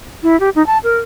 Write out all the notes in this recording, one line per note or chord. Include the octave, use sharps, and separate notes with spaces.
E4
G4
D#4
A5
A#4